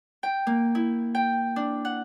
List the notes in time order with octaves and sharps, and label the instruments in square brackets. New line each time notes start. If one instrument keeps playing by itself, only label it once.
[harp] G5
A#3
E4
G5
D4
F#5